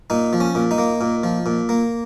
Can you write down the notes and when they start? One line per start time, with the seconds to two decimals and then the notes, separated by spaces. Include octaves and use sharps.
0.10 A#2 D#4
0.33 F3
0.40 C#4
0.55 A#2
0.71 D#4
0.78 A#3
1.01 A#2
1.24 F3
1.46 A#2
1.69 A#3